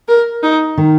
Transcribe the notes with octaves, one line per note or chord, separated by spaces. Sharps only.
A#4
D#4
D#3